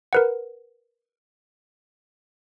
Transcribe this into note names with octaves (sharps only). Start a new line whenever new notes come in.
A#4 B4 F#5